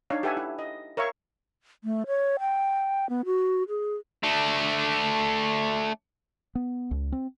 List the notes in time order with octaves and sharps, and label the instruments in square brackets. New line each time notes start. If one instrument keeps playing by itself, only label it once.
[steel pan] D4 D#4 C#5 F5
G4 A4 B4 E5 F#5 G#5
E4
D#5
A#4 C#5 E5 F5 C#6
[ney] A3
C#5
G5
B3
F#4
G#4
[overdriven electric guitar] A3 D4
[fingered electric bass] B3
C#2
C4